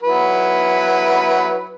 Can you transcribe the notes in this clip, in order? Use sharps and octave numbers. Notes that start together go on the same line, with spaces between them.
F#3 E4 B4